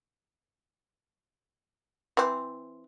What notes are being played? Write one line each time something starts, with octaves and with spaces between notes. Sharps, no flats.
E3 C4